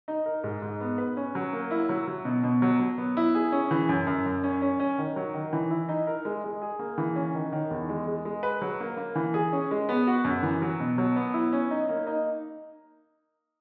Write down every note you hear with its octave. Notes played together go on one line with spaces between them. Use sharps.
D#4
A#4
G#2
G#2
B3
B4
C#4
F#3
A#3
E4
F#3
F#3
B2
B2
F#3
F#3
B3
E4
G#4
C#4
E3
F#2
F#2
F#2
C#4
C#4
C#4
D#3
F#3
D#3
E3
E4
D#4
A#4
G#3
G#3
G#4
A#3
E3
C#4
D#3
D#3
E2
G#3
G#3
G#3
B4
F#3
A#3
A#3
E3
G#4
C#4
G#3
B3
F#4
F#2
E3
F#3
B2
F#3
B3
E4
C#4
D#4
A#3
D#4